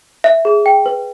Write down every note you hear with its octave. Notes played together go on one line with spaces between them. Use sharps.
E5
G#4
G5
B4